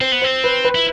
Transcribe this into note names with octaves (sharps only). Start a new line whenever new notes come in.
C4 C5
B3
C4 C5
B4
B4
E4